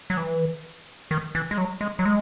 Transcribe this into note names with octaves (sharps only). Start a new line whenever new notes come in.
F#3
E3
D#3
E3
G#3
F#3
G#3
F#3
G#3